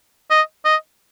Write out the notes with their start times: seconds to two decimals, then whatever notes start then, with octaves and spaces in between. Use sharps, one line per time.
0.30 D#5
0.65 D#5